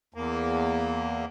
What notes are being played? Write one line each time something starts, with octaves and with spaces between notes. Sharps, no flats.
E2 A#3